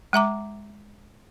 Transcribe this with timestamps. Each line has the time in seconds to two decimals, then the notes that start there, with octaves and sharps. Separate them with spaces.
0.13 G#3 E5 A#5 D6